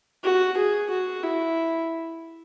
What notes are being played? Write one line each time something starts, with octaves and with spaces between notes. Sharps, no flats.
F#4
G#4
F#4
E4